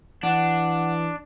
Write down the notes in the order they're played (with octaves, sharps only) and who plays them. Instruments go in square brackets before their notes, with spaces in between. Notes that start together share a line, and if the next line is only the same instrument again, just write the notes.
[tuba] E3 [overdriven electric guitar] D4 [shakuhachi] F#5